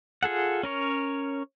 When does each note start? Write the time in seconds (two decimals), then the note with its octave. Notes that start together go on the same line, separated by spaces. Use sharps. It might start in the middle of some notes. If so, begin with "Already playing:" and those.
0.23 F4 G#4 A4 F#5
0.63 C#4 A#4 C#5